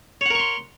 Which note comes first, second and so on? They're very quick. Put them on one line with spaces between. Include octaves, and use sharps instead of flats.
C#5 F#5 A#4 C#6 C6